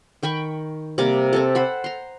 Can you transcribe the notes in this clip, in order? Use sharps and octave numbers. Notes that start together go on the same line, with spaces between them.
D#3 G5 B5 C#6
C3 G3 A#3 D6
C4 G4 A4
C5 F#5 B5
A#5 C6